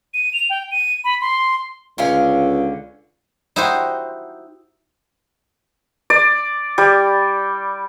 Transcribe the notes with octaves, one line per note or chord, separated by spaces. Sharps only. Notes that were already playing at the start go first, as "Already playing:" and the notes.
D#7
F7
G5
D#7
B5
C6
C#2 D3 C#4 F5
D#4 E4 F#4 G4 C5
D5
G3